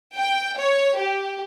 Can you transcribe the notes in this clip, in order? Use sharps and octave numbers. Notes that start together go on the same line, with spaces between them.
G5
C#5
G4